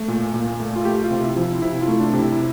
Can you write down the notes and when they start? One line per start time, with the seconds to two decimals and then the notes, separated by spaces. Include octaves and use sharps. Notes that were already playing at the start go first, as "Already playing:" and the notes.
Already playing: A3
0.08 A#2
0.34 A#2
0.60 A3
0.76 F4
0.85 A3 G4
1.04 F4
1.11 C3
1.24 E4
1.36 F3
1.42 E4
1.62 C3 E4
1.82 F4
1.88 A3
2.00 D4
2.13 C3
2.19 E4